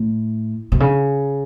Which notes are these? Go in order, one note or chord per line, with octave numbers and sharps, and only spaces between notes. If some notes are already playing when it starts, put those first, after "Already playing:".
Already playing: A2
B2
C#3